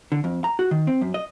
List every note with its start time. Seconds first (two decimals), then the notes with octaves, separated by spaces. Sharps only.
0.12 D3
0.24 F2
0.44 A#5
0.59 F#4
0.71 D#3
0.87 C4
1.01 F#2
1.14 D#5